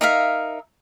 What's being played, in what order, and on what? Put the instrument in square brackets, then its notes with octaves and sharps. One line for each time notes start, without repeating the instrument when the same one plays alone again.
[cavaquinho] D#4 A#4 E5 F5